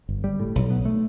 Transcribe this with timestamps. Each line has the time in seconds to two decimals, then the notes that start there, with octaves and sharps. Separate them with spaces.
0.09 G1
0.24 G3
0.40 A2
0.55 B1
0.70 B3
0.85 A3